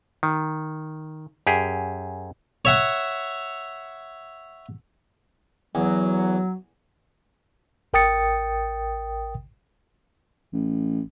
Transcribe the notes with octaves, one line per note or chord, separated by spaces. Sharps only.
D#3
F#2 G4 G#4
C#5 E5 F#5
E2 F#3
A1 A#4 G5 D#6 A6 C#7
A1